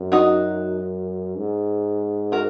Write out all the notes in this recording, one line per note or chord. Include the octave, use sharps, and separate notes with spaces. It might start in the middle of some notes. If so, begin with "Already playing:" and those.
Already playing: F#2
D#4 F#4
G#2
F#4 A#4